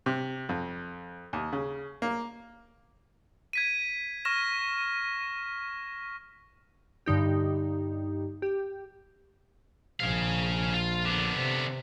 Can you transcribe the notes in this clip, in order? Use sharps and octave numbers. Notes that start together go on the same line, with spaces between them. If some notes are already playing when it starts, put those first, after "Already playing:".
C3
F2
D#2
C#3
A#3
G#6 B6 D#7
C#6 F6 A#6 E7
G2 D3 D#4 G4
G4
A#1 G#4 F5
F4
D3 B3
C3